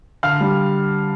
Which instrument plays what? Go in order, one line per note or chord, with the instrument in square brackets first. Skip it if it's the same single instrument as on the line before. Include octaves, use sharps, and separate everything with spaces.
[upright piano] D3 F5 F6
G3